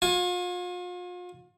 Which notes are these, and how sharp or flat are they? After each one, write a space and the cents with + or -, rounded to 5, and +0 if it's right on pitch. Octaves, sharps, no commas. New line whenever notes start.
F4 +40 G#5 +0